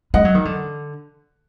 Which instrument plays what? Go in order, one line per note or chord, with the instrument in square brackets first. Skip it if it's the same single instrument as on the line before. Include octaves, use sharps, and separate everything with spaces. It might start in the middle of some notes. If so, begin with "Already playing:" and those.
[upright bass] G#3 [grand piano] D#5 F#5
[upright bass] F#3
D#3
D3